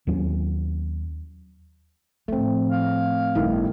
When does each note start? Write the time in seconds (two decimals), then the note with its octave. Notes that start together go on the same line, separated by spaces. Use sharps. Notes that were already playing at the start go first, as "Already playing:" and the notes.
0.07 D#2 F#3 B3 C#4
2.28 A2 F3 A3 C4
2.69 F5
3.35 G1 E2 A2 D#3